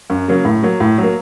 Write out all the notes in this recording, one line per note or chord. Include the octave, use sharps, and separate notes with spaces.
F#2
C#3 F#3 A#3
A2
F#3 A#3
A2
F#3 A#3